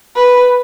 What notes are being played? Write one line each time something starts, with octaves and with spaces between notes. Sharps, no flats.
B4